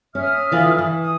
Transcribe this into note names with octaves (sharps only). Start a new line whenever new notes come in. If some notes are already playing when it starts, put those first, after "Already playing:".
C#4 E5 D#6 F6
D3 E3 F4
E3
D#6